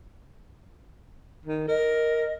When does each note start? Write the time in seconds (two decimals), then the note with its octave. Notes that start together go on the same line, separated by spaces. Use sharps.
1.45 D#3
1.68 A#4 D#5